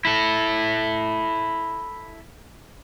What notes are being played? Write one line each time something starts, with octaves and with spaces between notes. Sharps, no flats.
E4 A4